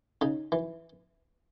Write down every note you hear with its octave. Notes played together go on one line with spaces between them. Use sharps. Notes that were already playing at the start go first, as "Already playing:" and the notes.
C#3 D#4
E3